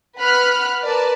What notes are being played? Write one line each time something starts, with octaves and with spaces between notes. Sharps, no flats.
B4 F#5 B5 F6 F#6
A#4 B4 D5 A5